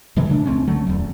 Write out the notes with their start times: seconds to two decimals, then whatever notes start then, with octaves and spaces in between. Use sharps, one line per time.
0.17 G#2 B2 D#3 E3
0.29 C#3 A3 D4
0.46 C#2 A3 C4 C#4
0.67 D3 F#3 A3
0.87 D1 E2